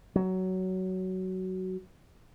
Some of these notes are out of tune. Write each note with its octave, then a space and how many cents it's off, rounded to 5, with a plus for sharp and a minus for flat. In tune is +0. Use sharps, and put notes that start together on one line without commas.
F#3 +15